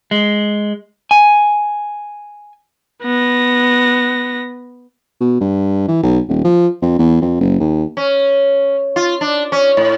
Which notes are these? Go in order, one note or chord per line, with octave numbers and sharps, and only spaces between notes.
G#3
G#5
B3 A#6
B2
G2
E3
B1
D#1
F3
F2
E2
F2
F#1
D#2
C#4
F4
D4
C#4
A2